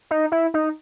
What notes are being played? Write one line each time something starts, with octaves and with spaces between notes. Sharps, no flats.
D#4
E4
D#4